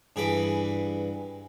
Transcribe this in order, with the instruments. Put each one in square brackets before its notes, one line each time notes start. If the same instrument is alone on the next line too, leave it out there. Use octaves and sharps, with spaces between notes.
[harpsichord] G2 E3 G#4 B5 D6